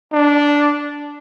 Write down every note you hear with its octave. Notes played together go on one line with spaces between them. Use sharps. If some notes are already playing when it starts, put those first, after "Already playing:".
D4